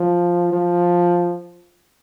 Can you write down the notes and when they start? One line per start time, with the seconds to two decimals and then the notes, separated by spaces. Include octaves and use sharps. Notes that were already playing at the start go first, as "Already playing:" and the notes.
Already playing: F3
0.52 F3